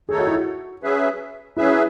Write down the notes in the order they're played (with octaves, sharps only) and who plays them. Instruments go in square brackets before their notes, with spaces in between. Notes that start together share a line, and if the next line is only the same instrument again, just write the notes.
[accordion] D#3 A3 D#4 A4 C#5 [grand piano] G#4
[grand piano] F#4
E4
F#4
[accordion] F#3 C#4 G#4 B4 E5
[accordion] F#3 C#4 G#4 B4 E5 [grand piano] E4